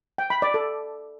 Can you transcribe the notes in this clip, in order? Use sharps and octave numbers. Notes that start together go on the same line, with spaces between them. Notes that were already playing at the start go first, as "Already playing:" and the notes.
G5
B5
D5
A4